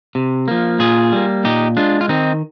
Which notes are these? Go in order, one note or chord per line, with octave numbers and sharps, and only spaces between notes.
C3
F3 A#3
A#2 F4 G#4
G3 A#3
A#2 D#4 G4
G#3 D4 F4
F4
D#3 C4 D#4